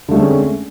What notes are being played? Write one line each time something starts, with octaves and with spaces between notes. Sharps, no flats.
D3 G#3 A3 C4 C#4